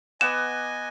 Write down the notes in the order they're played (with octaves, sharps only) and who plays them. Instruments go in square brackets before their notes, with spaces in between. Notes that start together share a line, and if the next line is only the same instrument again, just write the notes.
[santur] B3 F#5 D6 [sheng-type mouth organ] D#5 G#5 [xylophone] E7